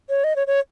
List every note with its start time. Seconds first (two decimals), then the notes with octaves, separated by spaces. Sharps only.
0.10 C#5
0.24 D#5
0.36 C#5
0.47 C#5